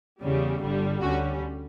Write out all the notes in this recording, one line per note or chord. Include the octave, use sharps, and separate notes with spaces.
E2 C#3 G3
G1 G2 D3 G3
D2 D3 G3 C#4 F#4